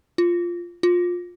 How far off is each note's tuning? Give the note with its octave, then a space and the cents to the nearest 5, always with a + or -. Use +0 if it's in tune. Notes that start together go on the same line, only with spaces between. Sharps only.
F4 -5
F4 +20